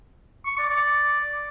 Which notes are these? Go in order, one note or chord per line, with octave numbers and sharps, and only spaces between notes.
C#6
D5
D5